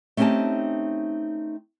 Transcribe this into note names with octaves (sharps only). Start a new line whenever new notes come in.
A3 C4 C#4 D#4 G4 A5